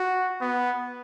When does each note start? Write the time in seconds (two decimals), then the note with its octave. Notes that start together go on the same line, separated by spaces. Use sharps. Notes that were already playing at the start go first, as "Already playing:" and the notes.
Already playing: F#4
0.41 B3